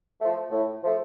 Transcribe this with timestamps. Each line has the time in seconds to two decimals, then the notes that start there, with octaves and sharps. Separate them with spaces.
0.20 F3 A3
0.51 A2
0.83 F3 A3